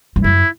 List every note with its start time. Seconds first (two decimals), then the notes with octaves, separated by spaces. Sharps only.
0.16 G2
0.24 F#2 E4